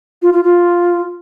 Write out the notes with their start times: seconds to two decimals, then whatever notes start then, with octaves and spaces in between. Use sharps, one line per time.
0.22 F4
0.33 F4
0.44 F4